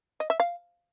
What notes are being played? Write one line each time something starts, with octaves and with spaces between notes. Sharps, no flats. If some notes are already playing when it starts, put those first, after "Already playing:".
D#5
E5
F5